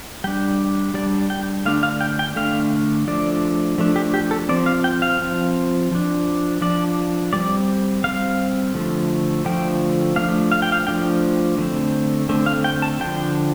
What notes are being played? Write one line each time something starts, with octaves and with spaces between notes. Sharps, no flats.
G3 D4 G5
G3 D4 D5
G5
D3 A3 D4 F5
F5
G5
G5
D3 A3 D4 F5
F3 A3 D4 D5
F3 A3 D4
G4
G4
A4
F3 C4 D5
F5
G5
F5
F3 C4
F3 D4
F3 D4 D5
G3 C4 D5
G3 C4 F5
D3 F3 A3
D3 F3 A3 G5
F3 A3 D4 F5
F5
G5
F5
F3 A3 D4 G5
D3 A3 C4
D3 A3 C4
F5
G5
A5
D3 F3 D4 G5